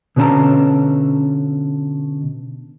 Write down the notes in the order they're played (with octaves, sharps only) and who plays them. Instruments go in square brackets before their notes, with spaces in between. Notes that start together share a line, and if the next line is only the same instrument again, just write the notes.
[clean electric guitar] B2 D3 C#4 A#4 A5 A#5